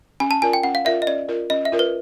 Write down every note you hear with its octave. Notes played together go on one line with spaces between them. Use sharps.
C#4 G#5
A5
F4 A#4 D5 G#5
G5
C#4 F#5
F5
F4 A#4 D5 E5
D#5
C#4 D5
F4 A#4 D5
C#4 D#5
E5
F4 A#4 D5
B4